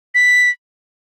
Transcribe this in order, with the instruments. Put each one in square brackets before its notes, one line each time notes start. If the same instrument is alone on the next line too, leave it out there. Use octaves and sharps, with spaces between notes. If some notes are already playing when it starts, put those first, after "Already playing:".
[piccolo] B6